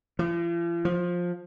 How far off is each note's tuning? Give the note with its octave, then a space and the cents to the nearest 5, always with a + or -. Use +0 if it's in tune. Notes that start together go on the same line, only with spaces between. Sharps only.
F3 -45
F3 +15